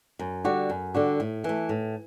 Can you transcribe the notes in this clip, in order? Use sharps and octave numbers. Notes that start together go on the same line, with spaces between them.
F#2
D3 G3 D4 F#4
F#2
D3 G3 D4 F#4
A2
E3 A3
A2